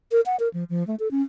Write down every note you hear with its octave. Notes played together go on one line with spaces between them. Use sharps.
A#4
F#5
A#4
F3
F3
A3
A4
C#4